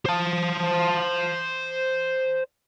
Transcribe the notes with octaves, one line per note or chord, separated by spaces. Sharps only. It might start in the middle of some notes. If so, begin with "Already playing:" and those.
C5 A5